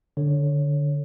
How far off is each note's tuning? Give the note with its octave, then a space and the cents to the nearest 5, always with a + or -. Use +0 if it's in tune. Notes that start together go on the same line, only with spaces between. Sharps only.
D3 +0 C#5 +0